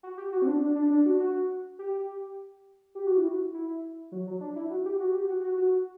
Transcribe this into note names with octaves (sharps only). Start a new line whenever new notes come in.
F#4
G4
F#4
C4
D4
D4
D4
D4
F#4
F#4
G4
G4
F#4
E4
F#4
E4
F#3
F#3
D4
E4
F#4
G4
F#4
G4
F#4
F#4
F#4